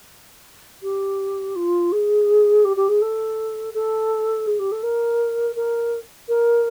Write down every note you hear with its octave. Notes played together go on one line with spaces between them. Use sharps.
G4
F4
G#4
G4
G4
G#4
A4
A4
G#4
G4
A4
A#4
A#4
A#4